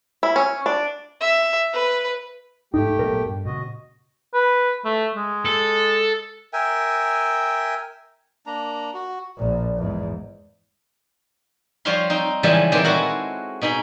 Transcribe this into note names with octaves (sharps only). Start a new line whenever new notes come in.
E4
C#4
D4
E5
B4
D1 G#2 A3 D#4 G4 G5
A#2 F#3 B3 A#4
G2
A#2 C#3 F#4 D#5
B4
A3
G#3
A4
A#4 E5 G5 G#5
A#3 D4 A#5
F#4
A#1 A#2
E2 G#2
F3 G3 C5 C#5 F5 C6
C4 D#4
C#3 E3 F3 G3 G#3 A4
A#2 D#3 E3 C4 G4
G#3 E4 F#4 A4 A#4 F#5
B2 D#4 G#4 B5